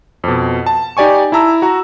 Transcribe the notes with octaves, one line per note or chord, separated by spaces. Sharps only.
F2 B2
A5
D#4 G4 D5 G#5 C#6
E4 A5 A#5 E6
F#4 A#5